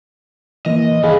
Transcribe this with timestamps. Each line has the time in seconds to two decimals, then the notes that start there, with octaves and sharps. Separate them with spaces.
0.66 E3 A#3 D#5
1.03 G2 D#3 E4 G#4 F5